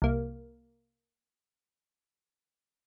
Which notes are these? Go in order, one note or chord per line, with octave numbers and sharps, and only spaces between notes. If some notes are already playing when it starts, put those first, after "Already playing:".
C2 A#3